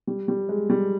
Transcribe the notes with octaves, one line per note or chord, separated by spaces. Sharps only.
G3
G3
G#3
G3